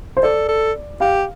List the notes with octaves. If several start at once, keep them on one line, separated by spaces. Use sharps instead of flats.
C5
A4 D5
A4
G4 F5